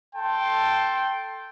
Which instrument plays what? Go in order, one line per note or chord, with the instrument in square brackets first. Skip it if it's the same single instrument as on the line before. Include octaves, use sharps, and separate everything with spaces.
[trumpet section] A4 G5 A5 C6